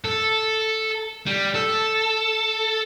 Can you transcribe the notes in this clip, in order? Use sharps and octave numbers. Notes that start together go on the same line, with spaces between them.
A4
G3
A4